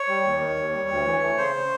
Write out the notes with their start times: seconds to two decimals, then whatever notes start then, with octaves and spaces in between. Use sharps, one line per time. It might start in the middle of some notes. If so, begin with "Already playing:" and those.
Already playing: C#5
0.08 G3
0.24 D#2
0.40 D#3
0.56 D#2
0.73 G3
0.89 D2
1.05 E3
1.21 A3
1.37 C#3 C5